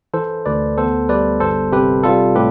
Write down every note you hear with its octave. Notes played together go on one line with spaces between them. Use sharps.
E3 A4 C5
D2 B4 D5
B3 A4 C5
G3 B4 D5
G1 A4 C5
C3 G4 B4
G3 F4 A4
A2 G4 B4